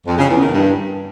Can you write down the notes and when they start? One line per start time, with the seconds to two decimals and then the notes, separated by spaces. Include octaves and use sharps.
0.07 F2
0.18 C#3
0.30 E2
0.41 D#3
0.52 G2